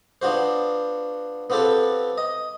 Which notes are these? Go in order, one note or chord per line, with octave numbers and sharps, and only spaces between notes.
B3 D4 F4 F#4 C5
B3 C4 F4 G4 A4 B4
D#5